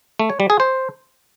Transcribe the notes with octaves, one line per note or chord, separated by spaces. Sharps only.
A3
C#5
G3
G#4
C5